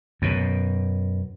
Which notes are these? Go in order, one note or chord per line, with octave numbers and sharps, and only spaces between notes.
F#2 B2